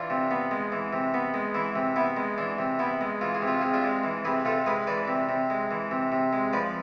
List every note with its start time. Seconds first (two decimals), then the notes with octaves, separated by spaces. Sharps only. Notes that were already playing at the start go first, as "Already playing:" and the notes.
Already playing: E3 D4 F4
0.10 C3
0.31 B3
0.51 G#3
0.72 E3
0.93 C3
1.14 B3
1.34 G#3
1.54 E3 E4
1.76 C3
1.96 B3 E4
2.17 G#3
2.38 E3 D4
2.58 C3
2.79 B3 E4
3.01 G#3
3.21 E3 F4
3.35 G#4
3.42 C3
3.48 F4
3.61 C3 G#4
3.74 D4 F4
3.84 G#3
4.04 E3
4.25 C3 G#4 B4
4.45 C3 F4 A4
4.66 G#3 G#4 B4
4.87 E3 B4 D5
5.08 C3
5.29 C3
5.50 G#3
5.71 E3
5.91 C3
6.12 C3
6.33 G#3
6.53 F3 B4 D5